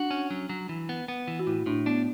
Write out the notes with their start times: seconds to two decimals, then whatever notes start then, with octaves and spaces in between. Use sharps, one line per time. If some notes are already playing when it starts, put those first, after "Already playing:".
Already playing: D4 F#4
0.11 C#4
0.30 F#3
0.49 F#3
0.69 E3
0.89 B3
1.08 B3
1.28 E3
1.39 F#4
1.47 A2 E4
1.66 A2 D4
1.86 B3 D4